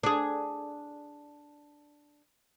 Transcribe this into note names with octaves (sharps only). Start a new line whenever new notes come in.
D4 G#4